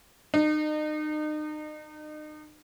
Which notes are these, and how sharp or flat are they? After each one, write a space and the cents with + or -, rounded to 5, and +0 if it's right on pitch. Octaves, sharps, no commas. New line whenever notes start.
D#4 -35